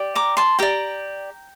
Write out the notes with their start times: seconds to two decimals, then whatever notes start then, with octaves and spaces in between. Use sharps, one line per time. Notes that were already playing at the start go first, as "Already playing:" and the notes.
Already playing: G4 D5
0.15 A#5 D6
0.37 A5 C6
0.59 G4 D5 G5 A#5